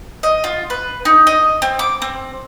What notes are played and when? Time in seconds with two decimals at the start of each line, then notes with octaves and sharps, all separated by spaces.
0.23 D#5
0.44 F4
0.70 B4
1.05 D#4
1.27 D#5
1.62 C4
1.79 D6
2.02 C4